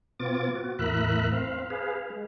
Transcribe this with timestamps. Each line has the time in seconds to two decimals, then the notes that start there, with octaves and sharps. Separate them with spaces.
0.20 B2 B3 C4 F4 D6 A6
0.56 F#4
0.79 E2 A2 A#4 E5 B5 F#6
1.32 C4 F5
1.70 G#4 B4 F5
2.10 G#3